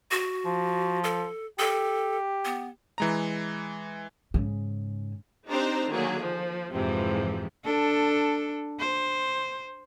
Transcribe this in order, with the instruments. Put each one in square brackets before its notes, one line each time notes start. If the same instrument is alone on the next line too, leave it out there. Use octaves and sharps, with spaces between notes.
[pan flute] F#4
[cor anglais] F3
[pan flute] A4
[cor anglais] G4 [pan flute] A4
[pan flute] B3
[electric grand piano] E3 G#3 A#5
[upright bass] G#2 C#3
[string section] C4 D4 D#4 G4 C5 A#5
D3 D#3 F#3 A#3 G#4
F3
F2 G#2 C3 E3 F3 G#3
[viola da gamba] D4 A4
C5